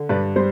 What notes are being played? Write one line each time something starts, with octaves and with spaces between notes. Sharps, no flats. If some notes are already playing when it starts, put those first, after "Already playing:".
Already playing: D3
G2 B4 D5
G3 C5